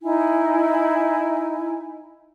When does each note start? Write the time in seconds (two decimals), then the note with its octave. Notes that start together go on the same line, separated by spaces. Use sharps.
0.02 D#4 E4 G#5